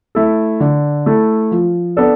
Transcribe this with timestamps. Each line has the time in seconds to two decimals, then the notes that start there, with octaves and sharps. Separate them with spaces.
0.15 A3 E4 A4
0.60 D3
1.06 A3 E4 A4
1.51 F3
1.97 B3 D4 A4